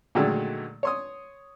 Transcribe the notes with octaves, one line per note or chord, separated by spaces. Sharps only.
A#2 D3 D#3 F#3 G#3 A3
C#5 C6 D#6